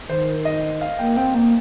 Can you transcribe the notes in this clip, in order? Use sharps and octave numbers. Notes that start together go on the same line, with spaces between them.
D#3 C5
D#5
F5
A#3 G5
C4 G5
A#3 G5